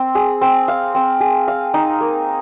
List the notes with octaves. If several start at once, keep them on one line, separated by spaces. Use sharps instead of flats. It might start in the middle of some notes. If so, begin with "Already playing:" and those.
Already playing: C4
G#4
C4
F5
C4
G#4
F5
D#4
A#3